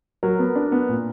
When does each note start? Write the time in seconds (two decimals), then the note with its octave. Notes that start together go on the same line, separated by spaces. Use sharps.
0.23 F#3 A#4
0.39 B3
0.55 D4
0.72 B3
0.89 A#2